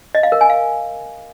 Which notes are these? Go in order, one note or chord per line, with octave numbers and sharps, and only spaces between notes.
D#5
F5
A#4
G#5
F5